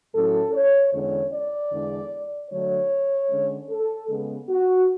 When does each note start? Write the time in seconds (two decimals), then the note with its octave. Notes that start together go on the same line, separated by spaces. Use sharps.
0.14 A2 F#3 C#4 A4
0.54 C#5
0.93 E2 D3 G#3 C#4 C#5
1.33 D5
1.72 E2 D3 G#3 D4
2.51 D3 F#3 A3 D4 C#5
3.30 D3 G#3 C#4
3.69 A4
4.09 C#3 G#3 B3
4.49 F#4